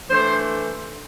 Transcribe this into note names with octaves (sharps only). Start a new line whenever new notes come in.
E3 A3 D4 C5